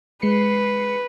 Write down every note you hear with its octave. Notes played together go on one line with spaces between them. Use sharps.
G#3 B4 C7 C#7